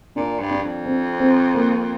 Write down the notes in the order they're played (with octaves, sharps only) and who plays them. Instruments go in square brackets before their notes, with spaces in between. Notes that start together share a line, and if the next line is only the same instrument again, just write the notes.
[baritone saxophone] A#2 [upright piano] D4
[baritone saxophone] G2
[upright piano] D4
[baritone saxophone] F2
[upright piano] C4
C4
A#3